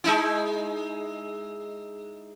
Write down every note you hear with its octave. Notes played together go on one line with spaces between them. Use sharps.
G#3 D#4 E4